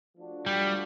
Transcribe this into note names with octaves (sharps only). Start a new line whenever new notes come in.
F3 A3 D4 F#4
G3